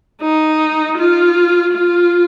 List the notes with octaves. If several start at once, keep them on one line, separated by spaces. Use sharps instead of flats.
D#4
F4
F4